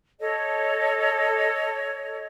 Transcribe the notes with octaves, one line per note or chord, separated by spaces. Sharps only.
A4 C#5 D#5